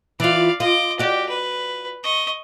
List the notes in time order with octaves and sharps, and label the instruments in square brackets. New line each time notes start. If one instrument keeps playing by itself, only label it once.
[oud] E3 F4 [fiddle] D5 F5
[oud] F4 [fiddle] D#5 D6
[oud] F#4 D5 [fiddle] G4
[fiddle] B4
D#5 C#6